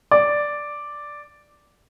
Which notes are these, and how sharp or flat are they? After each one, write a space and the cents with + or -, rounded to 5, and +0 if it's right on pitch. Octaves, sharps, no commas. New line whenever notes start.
D5 +0